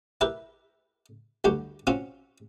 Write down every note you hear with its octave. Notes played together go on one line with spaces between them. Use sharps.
E4 G4 A#4 B4
D2 G2 F#4 G4
C4 C#4 F4 F#4